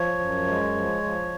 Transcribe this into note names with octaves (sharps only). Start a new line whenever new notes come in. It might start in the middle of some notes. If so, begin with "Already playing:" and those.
Already playing: F3 C#5
F#2
G#3
F3
F3